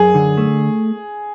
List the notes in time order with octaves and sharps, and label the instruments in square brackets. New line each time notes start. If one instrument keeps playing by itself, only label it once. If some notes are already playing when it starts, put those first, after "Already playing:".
Already playing: [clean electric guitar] F#2 [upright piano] G#4
[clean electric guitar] D3
A3